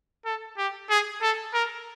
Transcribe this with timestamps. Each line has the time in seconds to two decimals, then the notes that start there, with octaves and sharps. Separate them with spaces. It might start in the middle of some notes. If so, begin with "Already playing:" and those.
0.25 A4
0.58 G4
0.90 G#4
1.22 A4
1.54 A#4